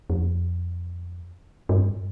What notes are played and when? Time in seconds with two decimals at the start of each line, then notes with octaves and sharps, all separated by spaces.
0.10 F2
1.69 G2